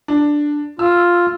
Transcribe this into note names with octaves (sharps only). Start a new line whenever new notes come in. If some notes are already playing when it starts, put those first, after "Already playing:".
D4
F4 E6